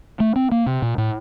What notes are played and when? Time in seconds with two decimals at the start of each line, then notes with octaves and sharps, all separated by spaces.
0.20 A3
0.36 C4
0.52 A#3
0.66 C3
0.82 A#2
0.98 A2